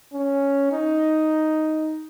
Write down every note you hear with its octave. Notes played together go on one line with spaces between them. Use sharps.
C#4
D#4